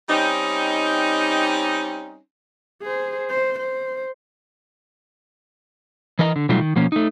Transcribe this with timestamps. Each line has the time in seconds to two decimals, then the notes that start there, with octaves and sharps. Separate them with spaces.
0.09 G3 C4 C#4 D#4
2.83 G#4 C5
3.30 C5
3.59 C5
6.19 E3 A#4 D#5 A5 A#5
6.36 D3
6.49 B2 F#3 G3 A3 D#4 F4
6.61 D#3
6.76 B2 F3 A#3 C#4
6.92 A3 D#4